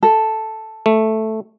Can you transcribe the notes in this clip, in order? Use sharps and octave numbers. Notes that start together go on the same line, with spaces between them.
A4
A3